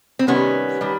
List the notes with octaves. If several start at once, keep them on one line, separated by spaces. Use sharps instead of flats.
C4
C3 D#3 G3 B3 C#4
D#3 G3